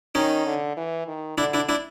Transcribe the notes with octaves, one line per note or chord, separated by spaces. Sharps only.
D#3 C#4 D#4
D3
E3
D#3
D3 D4 E4
D4 E4
D4 E4